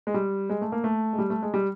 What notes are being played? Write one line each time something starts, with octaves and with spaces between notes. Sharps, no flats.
G#3
G3
G#3
A3
A#3
A3
G#3
G3
A3
G#3
G3